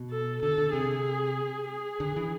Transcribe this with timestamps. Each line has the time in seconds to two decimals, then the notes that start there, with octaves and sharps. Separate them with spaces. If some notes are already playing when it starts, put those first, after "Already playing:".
Already playing: B2
0.11 A4
0.42 D3 A4
0.58 D3
0.73 C3 G#4
1.69 G#4
2.00 D3
2.16 E3